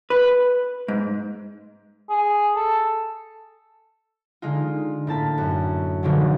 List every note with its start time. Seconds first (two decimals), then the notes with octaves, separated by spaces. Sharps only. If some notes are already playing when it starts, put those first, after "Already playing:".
0.10 B4
0.88 G#2
2.10 G#4
2.56 A4
4.42 D3 G#3 D#4 F4
5.07 A2 A#3 A5 B6
5.38 F#2
6.03 G#1 B2 D3 F3 F#3